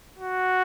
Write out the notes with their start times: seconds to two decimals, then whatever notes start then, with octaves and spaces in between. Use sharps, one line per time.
0.18 F#4